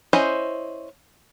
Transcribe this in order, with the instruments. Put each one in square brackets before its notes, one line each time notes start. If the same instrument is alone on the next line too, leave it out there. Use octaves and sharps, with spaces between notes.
[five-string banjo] C#4 E4 C5 D#5